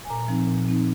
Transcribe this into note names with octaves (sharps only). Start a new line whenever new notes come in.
G#5
A#2 A#5
F3 C4 D#4
A#2
F3 C4 D#4